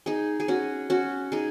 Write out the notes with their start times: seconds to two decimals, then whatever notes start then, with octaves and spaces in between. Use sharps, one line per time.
0.06 D#4 G#4
0.40 G#4
0.48 C#4 F#4
0.90 C#4 F#4
1.32 D#4 G#4